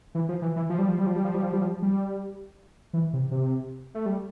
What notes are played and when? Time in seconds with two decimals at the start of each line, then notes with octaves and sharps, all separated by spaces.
0.15 E3
0.29 F3
0.42 E3
0.56 E3
0.70 F3
0.79 G3
0.88 F3
0.98 G3
1.06 F3
1.16 G3
1.25 F3
1.34 G3
1.43 F3
1.53 G3
1.62 F3
1.82 G3
2.93 E3
3.13 C3
3.31 C3
3.95 A3
4.06 G3